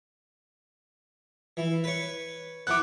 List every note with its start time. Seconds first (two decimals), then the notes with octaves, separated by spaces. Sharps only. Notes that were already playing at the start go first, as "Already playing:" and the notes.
1.57 E3
1.84 B4 C#5
2.67 E3 B3 D6 F#6